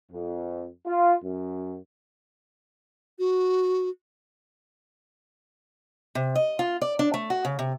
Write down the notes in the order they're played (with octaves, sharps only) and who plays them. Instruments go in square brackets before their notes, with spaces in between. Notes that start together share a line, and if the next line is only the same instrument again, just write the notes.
[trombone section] F2
F4
F#2
[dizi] F#4
[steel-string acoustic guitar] C3
D#5
F4
D5
D4
A3
F#4
C#3
C3